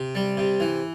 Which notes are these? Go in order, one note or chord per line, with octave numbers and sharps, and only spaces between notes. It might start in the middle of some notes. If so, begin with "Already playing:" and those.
Already playing: C3
G3
C3
E3